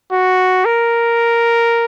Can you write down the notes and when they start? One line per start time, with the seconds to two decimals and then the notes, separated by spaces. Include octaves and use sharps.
0.12 F#4
0.65 A#4